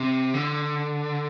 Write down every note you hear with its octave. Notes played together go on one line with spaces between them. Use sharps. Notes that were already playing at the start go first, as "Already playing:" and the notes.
Already playing: C3
D3